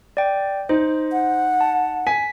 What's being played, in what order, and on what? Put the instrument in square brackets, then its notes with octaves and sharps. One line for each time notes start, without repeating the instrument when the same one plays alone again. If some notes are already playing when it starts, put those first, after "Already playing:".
[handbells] D5 G5
[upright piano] D#4 [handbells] C5
[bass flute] F#5
[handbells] A5
[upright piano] G#5 [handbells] B6